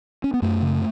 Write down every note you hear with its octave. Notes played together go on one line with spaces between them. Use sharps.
C#4
B3
F#2 A3
C#3